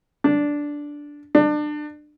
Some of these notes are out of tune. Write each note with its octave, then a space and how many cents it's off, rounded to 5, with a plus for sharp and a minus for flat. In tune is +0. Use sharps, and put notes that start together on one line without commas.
D4 -5
D4 +30